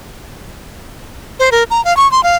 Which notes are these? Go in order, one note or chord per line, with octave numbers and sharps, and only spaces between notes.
C5
A#4
A#5
F5
C#6
C6
F5